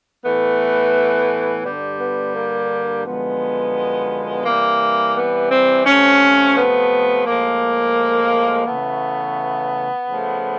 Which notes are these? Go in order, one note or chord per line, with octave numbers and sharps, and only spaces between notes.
A2 E3 A3 B3
G2 D3 G3
B3
A#3
F#2 D3 F3 G#3 B3
C3 E3 G3 A#3
B3
C4
C3 F3 A3 C#4
B3
A2 F3 G#3 A#3
C#3 E3 A3 B3
C#3 F3 A3